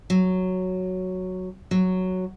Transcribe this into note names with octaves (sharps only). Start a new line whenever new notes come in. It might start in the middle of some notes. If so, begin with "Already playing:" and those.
F#3
F#3